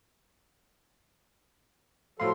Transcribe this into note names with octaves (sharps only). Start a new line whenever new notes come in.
A2 F3 F#3 A4 F5 C6